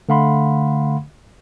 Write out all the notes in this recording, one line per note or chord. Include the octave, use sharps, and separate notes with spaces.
D3 A3 F5 F#5 B5 C6